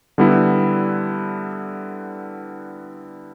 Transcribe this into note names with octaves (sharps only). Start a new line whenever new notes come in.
D3 G3 B3 E4